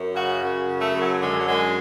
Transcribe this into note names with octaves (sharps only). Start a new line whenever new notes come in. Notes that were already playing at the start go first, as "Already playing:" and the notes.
Already playing: F#2
C#3 F#4
F#2
C#3
A3
F#2
F#3
D3 G#3
F#3
F#2 G#3